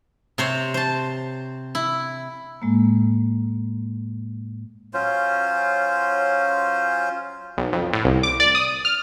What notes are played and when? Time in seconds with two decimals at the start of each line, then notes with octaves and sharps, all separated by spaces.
0.38 C3 C5 C#5
0.74 C5 A5
1.75 E4
2.62 A2 G#3 A#3
4.94 F#3 C#4 F4 C5
7.57 B1
7.73 F2
7.93 A2
8.05 C2
8.23 D6
8.40 D5
8.55 D#6
8.85 F6